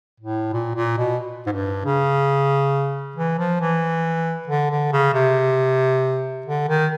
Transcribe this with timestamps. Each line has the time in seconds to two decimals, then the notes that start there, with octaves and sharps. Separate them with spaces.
0.20 A2
0.53 A#2
0.75 A#2
0.98 B2
1.46 G#2
1.52 G2
1.85 C#3
3.16 E3
3.38 F3
3.61 E3
4.47 D3
4.70 D3
4.92 C#3
5.14 C3
6.46 D3
6.68 D#3